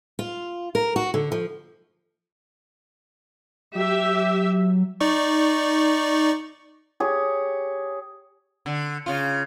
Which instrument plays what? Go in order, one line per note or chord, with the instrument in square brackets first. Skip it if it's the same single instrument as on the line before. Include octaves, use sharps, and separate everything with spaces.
[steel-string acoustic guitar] F4
A#4
F#4
D3
F3
[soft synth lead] F#3 [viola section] G4 E5
[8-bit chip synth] D#4 D5 C#6
[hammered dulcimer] G4 G#4 C#5
[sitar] D3
C#3 F4